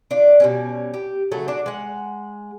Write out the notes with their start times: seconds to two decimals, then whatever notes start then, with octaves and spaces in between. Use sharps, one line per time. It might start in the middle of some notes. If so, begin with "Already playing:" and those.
0.11 D4 F4 D5
0.40 B2 G3 C#4
0.94 G4
1.32 C#3 F#3 A3
1.48 D4 F#4 D5
1.66 G#3 F#5